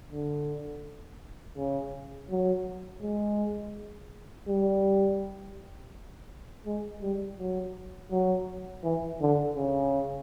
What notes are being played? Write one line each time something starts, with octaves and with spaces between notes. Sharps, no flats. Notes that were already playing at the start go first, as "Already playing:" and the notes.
D3
C#3
F#3
G#3
G3
G#3
G3
F#3
F#3
E3
D3
C#3